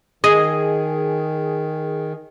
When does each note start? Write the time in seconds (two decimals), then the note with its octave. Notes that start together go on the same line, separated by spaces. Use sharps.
0.24 D#3 G#4 D#5